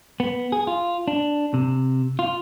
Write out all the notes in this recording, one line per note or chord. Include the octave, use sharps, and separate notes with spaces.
B3
G#4
F4
D4
C3
F4